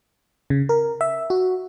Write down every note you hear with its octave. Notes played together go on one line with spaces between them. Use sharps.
C#3
A#4
E5
F#4